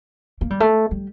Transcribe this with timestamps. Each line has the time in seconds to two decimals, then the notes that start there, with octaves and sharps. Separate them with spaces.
0.41 A#3
0.50 G3
0.60 A3
0.91 G3